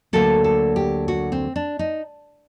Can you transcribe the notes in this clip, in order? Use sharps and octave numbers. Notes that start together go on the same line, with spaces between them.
D2 D3 F#3 A#3 A4
A4
G4
F#4
C4
D4
D#4